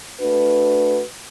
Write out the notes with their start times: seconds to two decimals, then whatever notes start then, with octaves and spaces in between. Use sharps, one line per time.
0.20 A3 D4 F#4 B4